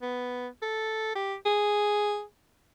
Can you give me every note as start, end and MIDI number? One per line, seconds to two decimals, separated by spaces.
0.02 0.47 59
0.62 1.14 69
1.15 1.34 67
1.46 2.22 68